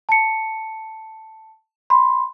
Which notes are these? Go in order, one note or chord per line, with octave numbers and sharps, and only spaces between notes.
A5 C#7
B5 C6